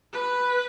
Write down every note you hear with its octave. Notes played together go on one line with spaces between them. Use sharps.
B4